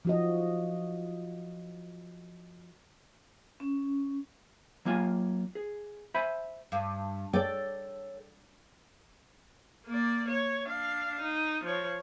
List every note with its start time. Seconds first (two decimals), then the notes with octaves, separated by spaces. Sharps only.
0.05 F3 F#4 D#5
3.60 C#4
4.85 F#3 A#3 F4 G#5
5.55 G#4
6.14 C5 E5 G#5 B5
6.72 G2
7.33 A4 C#5 D5 G5
9.86 A#3 D5
10.28 C#5
10.67 D4 F5
11.20 D#4
11.64 F3 C#5